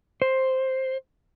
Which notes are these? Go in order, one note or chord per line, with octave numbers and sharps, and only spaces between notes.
C5